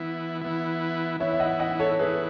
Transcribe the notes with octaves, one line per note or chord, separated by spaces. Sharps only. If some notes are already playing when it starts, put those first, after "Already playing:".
Already playing: E3 B3 E4
E3 B3 E4
E3 B3 E4 C#5 E5
E5
D#5 F#5
D#5 F#5
A4 C#5
E3 B3 E4 G#4 B4